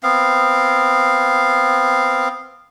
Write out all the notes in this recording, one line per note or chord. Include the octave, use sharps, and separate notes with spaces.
B3 C4 F5